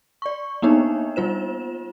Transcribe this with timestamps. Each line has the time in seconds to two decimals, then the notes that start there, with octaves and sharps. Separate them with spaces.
0.22 D5 C#6
0.62 A#3 B3 D4 D#4 C#5
1.16 G3 F4 C5 E7